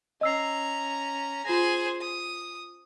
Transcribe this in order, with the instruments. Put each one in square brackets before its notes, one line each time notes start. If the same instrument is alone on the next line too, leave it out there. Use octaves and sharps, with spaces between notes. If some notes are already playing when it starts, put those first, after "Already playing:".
[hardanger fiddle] C#4 A#5 [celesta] D#5 E6 C7
[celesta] F4 A#6 [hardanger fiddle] G#4 C5
[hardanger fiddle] D#6